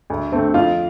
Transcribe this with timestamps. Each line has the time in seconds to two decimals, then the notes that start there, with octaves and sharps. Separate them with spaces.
0.10 D2
0.32 D3 A3 C4
0.54 F2 F4